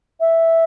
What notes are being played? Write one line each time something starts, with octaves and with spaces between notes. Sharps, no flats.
E5